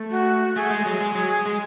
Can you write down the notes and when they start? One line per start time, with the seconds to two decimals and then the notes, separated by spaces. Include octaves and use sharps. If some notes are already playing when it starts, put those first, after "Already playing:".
Already playing: A3
0.11 F#4
0.56 A3 G#4
0.70 G#3
0.86 F#3
1.01 G#3
1.15 F#3
1.46 G#3